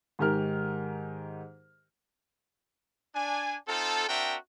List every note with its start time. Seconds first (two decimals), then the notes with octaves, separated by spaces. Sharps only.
0.19 G#2 D#3 G4 A#4 F6
3.15 D4 G#5
3.67 C4 D#4 F4 A4
4.08 C4 D4 F#4 A#4 E5 G5